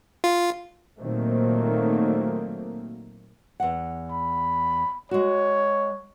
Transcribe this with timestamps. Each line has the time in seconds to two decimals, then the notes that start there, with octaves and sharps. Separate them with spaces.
0.24 F4
0.99 A#2 D#3 F#3 A3 A#3 C4
3.60 E2 F#5
4.11 B5
5.11 G#3 F#4 C#5